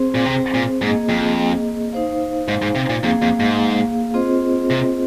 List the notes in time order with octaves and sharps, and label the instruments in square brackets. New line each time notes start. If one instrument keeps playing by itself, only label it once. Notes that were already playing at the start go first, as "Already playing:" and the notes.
Already playing: [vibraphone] C4 G#4 C5
[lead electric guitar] A#2
C3
A#2
[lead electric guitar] G#2 [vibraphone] A#3 G#4 D#5
[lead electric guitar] F2
[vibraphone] D#4 C5 F5
[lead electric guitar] G#2
G#2
C3
A#2
[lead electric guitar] F2 [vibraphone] A#3 G#4 F5
[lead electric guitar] F2
G#2
[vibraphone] C4 F4 G#4 C5 D#5
[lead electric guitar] C3